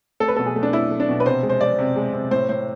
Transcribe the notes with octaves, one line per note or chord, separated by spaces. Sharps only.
A3 A4
B4
B2 A4
G#4
A3
D4
A3 E4
A3
D4
B2
B4
C3 C5
G#3
C5
G#3 D5
C3
G#3
C3
A2 C5
A2 C5